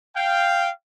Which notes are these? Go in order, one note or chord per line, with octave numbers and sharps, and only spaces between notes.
F5 G5